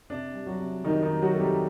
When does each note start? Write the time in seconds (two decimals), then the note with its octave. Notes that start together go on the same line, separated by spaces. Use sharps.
0.10 C3 D4
0.34 G3
0.46 F#3 F#4
0.60 C3
0.84 D#3 G3 D#4
1.03 D#3 D#4
1.09 G3
1.22 F#3 F#4
1.34 C3 A4
1.40 G3 G4